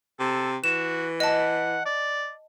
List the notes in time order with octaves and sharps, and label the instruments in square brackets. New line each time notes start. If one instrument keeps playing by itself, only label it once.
[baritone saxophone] C3 [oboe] A4
[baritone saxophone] E3 [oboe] F#4 [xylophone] E7
[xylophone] D#5 A5 [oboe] F#5
[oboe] D5